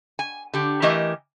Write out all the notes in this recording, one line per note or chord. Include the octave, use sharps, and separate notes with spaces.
G#5
D3 G4
E3 A3 G4 A#4 D#5